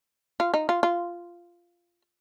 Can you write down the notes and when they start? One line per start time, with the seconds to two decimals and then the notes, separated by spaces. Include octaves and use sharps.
0.40 F4
0.54 D#4
0.69 F4
0.83 F4